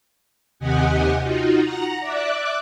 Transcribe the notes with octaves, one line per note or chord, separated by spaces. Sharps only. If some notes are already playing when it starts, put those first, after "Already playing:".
D#2 C3 G4 D#5 F#5 G#5
D#4 F4 F#4
F#5 A#5 A#6
D5 E5 D6 F#6